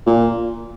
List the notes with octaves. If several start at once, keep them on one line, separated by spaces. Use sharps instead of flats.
A#2